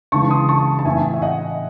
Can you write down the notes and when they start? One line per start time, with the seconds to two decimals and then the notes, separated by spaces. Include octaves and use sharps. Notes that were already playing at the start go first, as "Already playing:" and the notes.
0.12 C#3 E3 G#3 A5 C#6
0.30 C6 D#6
0.49 A5 C#6
0.79 A5
0.85 A2 E3 C4 E5 G#5
1.13 E5
1.22 D#5 F#5